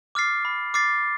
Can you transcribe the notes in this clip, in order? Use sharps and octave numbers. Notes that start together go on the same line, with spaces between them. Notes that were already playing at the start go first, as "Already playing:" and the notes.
D6 F6 A6 C7
B5
D6 F6 A6 C7